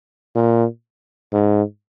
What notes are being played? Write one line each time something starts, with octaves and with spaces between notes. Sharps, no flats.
A#2
G#2